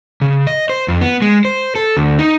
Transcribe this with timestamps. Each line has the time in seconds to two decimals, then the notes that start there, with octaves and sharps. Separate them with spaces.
0.21 C#3
0.47 D#5
0.69 C5
0.88 F2
1.01 B3
1.22 G#3
1.45 C5
1.75 A4
1.97 D2
2.19 D#4